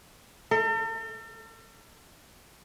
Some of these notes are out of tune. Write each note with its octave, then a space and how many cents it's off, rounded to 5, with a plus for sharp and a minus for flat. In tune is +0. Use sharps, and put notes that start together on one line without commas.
A4 +45